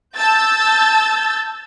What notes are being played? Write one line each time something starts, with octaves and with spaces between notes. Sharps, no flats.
A5 E6 G6 A6